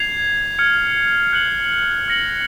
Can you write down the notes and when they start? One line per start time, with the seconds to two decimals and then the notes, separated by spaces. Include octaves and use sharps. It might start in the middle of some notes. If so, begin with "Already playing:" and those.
Already playing: G#6 C7 F7
0.59 F6 G#6 C#7
1.33 F#6 C#7 F#7
2.08 F6 A#6 C#7 F#7